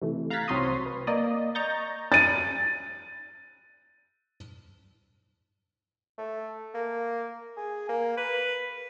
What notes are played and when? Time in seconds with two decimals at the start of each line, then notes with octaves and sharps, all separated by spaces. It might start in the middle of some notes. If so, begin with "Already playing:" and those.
0.02 C3 E3 A3
0.30 F5 A#5 F#6 G#6 A6 B6
0.48 C2 F#3 C4 C6 C#6 D#6
0.86 B4
1.07 A#3 D5 D#5
1.55 D#5 A#5 C#6 G6 A6
2.12 A6 D#7
6.18 A3
6.74 A#3
7.57 G#4
7.89 A#3
8.17 B4